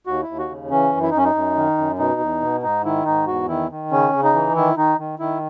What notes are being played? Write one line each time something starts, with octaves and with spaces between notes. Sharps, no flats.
D#2 F#4
D#2 E4
F#4
C#3
E3 C#4
F#2
E4
D#4
F#2 C#4
D#4
F#2
D#3
F#2
B2 D#4
E2
B2
G#2 D#4
D#3 E4
G#2 D#4
E2 F#4
D#3 E4
D#3
C#3 C#4
C#3
D#4
E3
D#3 E4
D#3 D#4
D#3
D#3 E4